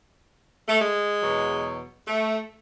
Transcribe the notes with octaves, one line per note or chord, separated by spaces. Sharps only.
A3
G#3
E2 B2 F#3
A3